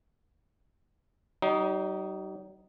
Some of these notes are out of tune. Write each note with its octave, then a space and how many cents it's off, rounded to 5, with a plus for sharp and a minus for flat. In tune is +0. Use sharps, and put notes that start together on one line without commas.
G3 -45 D#4 +0